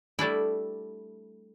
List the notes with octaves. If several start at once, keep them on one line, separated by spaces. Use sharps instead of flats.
G3 A3 D4 E4